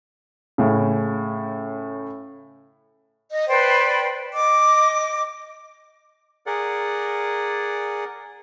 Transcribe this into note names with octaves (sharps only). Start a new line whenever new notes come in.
A2 C#3
D#5
B4 C5 D5 G5
D#5 D6
G#4 A#4 D5 F#5